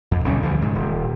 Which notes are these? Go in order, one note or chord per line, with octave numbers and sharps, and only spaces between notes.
F2
B1 D3 G3 C#4
D2 D3 E3 F3
G#2 C#3
D#1